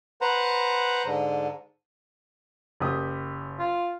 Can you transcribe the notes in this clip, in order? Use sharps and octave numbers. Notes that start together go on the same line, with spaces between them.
B4 C5 F#5 A#5
G#2 D3
F#1 G4 D#6
F4